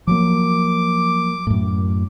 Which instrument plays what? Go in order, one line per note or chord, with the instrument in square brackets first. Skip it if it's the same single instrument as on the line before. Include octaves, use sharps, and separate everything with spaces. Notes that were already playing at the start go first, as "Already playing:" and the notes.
[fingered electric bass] F3 F#3 A#3 [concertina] D6
[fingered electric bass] F#2 A2